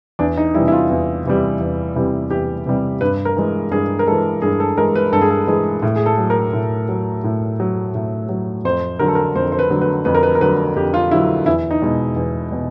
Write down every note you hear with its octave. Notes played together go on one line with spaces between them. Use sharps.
E2 D4
D#4
C3 E3 G3 E4
E4
F4
E2
C3 E3 G3
E2
C3 E3 G3
E2 G4
C3 E3 G3
G2 B4
A#4
E3 G#3
G2 G#4
A#4
E3 G#3 A4
G2 G#4
A4
E3 G#3 A#4
B4
G2 A4
G#4
A4
E3 G#3 G#4
A2
G#4
A4
F#3
A#4
A2
F#3
A2
F#3
A2
F#3
F2 C5
D3 F#3 A#4
A4
A#4
F2 C5
C5
B4
D3 F#3
B4
F2 B4
A#4
B4
A#4
D3 F#3 B4
F2 G4
F4
D3 F#3 E4
E2 E4
D#4
B2 G#3
E2
B2